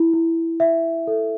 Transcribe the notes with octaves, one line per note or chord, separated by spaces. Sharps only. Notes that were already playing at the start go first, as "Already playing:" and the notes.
Already playing: E4
E4
E5
A4